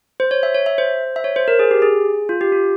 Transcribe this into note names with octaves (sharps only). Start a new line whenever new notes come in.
C5
C#5
E5
C#5
E5
C5
E5
C#5
C5
A#4
G#4
G4
G#4
F4
G4
F4